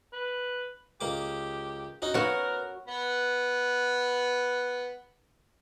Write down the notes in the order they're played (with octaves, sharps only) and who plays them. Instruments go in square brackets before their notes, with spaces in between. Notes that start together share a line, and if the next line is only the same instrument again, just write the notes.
[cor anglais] B4
[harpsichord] C#2 A#3 D6 [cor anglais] G4
[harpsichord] C#4 D#4 F#4
[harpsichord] B3 [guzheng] F#4 C#5 [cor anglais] A#4
[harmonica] B3 B4